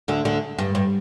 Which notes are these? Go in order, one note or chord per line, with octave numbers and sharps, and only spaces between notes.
D2 D3
D2 D3
G2
G2